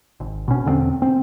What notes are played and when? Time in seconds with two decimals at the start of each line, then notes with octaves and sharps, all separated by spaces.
0.20 G#1
0.48 B2 C#4
0.65 E2 D3 A3 C4
1.02 C4